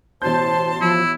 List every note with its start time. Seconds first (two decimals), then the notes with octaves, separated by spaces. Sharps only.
0.22 A1 B2 C5 A5 C6 G6
0.81 F3 E4